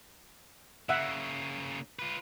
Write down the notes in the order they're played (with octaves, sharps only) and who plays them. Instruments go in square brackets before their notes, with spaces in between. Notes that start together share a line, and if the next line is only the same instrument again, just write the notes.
[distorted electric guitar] C#3 A#3 [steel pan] E5 F#5
[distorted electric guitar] F4 B4